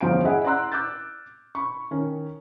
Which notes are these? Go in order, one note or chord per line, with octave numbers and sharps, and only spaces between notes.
G1 E2 F3 F5 G5 D7
E4 G#4 D#5 E5 F#5
D5 F#5 A#5 C6 E6 F#6
D6 E6 F#6 G6 A6
B5 C#6
D#3 C#4